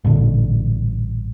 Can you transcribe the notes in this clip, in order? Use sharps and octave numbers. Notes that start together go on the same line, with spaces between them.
A1 G2 A#2 D3